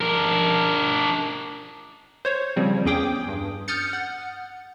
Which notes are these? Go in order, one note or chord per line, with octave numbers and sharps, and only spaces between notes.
D4 A#4
C5 C#5
C#3 F3 G3 C4
E2 C#4 G#4 G5 D6 D#6
G2
D#6 F6 G6 A6 C#7
F#5